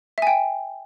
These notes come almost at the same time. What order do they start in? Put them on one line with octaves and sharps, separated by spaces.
E5 G#5 G5